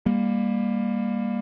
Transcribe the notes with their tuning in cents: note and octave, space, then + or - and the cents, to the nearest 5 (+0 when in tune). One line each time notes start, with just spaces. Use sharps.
G3 +30 A#3 +15